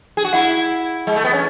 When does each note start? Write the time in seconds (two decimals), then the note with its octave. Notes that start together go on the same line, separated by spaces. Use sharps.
0.17 G#4
0.24 F#4
0.33 E4 F#5
1.07 G#3
1.16 A3
1.24 B3
1.33 C#4